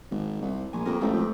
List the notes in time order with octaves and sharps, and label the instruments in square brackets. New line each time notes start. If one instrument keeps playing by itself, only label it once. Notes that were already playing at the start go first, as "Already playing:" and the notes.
[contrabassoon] G#1
C2
[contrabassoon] A#1 [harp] G#5
[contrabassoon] F2 [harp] A#3 G4 A#4
[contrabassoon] A1 [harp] G#3 A3 C4
[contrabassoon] F2